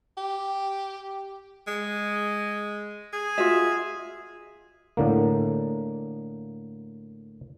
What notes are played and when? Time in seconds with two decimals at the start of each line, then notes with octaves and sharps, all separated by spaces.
0.17 G4
1.67 G#3
3.13 G#4
3.38 F4 F#4 E5
4.97 A2 D3 A#3